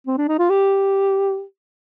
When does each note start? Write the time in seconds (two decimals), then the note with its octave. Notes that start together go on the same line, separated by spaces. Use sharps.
0.07 C4
0.18 D4
0.28 D#4
0.39 F4
0.50 G4